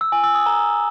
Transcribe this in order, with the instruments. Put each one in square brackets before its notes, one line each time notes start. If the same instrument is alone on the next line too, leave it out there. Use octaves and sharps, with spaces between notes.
[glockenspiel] E6
G#5
E6
D#6
A#5